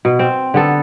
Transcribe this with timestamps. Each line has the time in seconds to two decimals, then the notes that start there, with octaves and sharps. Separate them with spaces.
0.05 B2
0.19 C4
0.54 D3 B3 A4